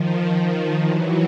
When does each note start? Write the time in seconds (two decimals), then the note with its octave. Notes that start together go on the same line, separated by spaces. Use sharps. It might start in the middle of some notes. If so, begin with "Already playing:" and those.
Already playing: D#3 F3
0.83 E3 F#3